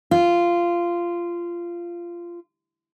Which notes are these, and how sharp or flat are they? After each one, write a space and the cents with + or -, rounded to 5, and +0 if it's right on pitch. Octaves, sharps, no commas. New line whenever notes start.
F4 -15